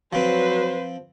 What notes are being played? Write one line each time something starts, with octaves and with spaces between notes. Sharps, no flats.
F3 F#3 C4 B4 C5